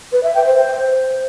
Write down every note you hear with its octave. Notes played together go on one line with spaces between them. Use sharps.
B4
E5
G5
C5